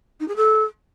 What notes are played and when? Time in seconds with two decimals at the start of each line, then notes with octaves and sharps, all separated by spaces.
0.20 D#4
0.28 G#4
0.36 A4